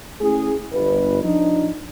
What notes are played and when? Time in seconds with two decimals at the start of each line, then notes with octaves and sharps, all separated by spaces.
0.21 A3 C#4 E4 G#4
0.72 G1 B4
1.23 F3 D4 D#4